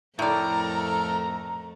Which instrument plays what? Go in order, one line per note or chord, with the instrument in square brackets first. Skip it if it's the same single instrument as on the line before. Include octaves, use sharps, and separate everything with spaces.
[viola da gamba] F2 A3 [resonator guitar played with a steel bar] A2 D5 [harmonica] A4 A#4 [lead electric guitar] A#5